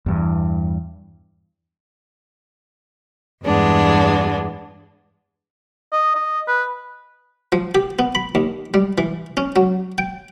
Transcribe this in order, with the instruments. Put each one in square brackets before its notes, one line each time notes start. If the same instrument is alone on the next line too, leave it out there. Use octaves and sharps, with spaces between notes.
[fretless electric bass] E2 G2 E3
[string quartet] E2 G2 G#3 B3 D4
[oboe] D#5
D#5
B4
[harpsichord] F3
G4
B3
B5
D#2
G3
E3
C#4
F#3
G5